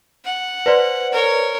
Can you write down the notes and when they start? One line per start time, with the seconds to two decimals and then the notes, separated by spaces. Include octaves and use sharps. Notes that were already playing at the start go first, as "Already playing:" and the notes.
0.24 F#5
0.66 B4 C5 D5
1.12 A#4 C#5